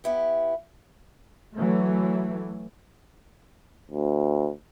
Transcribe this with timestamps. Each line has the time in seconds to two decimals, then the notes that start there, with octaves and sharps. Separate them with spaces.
0.04 B3 E4 G4
1.55 E3 F#3 A3
3.91 D2